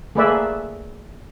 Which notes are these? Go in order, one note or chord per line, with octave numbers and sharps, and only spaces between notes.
A3 A#3 G#4 B4 D5 E5